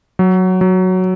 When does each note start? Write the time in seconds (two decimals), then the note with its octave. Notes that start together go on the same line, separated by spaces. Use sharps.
0.19 F#3
0.61 F#3